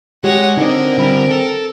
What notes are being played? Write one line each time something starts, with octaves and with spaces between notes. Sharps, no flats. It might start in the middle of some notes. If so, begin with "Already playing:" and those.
G#3 G4 C#5 F#5
D3 C4 D4 D#4 A#4 D#5
D3 G3 D4 B5
A4